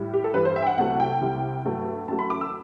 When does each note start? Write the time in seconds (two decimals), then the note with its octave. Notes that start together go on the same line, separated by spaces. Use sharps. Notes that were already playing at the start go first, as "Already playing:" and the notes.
Already playing: A2 G3
0.14 G4
0.24 A4
0.34 G2 E3 G3 B4
0.45 C5
0.56 E5
0.62 G5
0.67 F#5
0.78 C2 C3 F#3 A3 F#5
1.00 G5
1.21 C2 C3 G3
1.65 G2 F#3 A3
2.08 F#2 F#3 A3 A5
2.19 B5
2.30 D6
2.41 E6